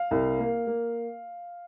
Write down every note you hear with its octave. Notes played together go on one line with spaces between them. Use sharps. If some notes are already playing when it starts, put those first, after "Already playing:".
Already playing: F5
C2
A#3
A#3